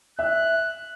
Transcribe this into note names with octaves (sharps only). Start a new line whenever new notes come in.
E5 F#6